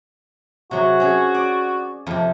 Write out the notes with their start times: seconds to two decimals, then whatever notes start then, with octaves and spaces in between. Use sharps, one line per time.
0.71 C3 F#3 F#4 G#4
1.00 C#4 G#4
1.35 D5
2.07 F2 C3